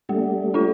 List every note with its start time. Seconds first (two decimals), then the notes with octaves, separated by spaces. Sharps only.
0.09 G3 A3 A#3
0.54 D4 F4 A4